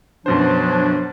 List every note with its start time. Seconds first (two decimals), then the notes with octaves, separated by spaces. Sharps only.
0.26 F#2 B2 F3 F#3 D4 C5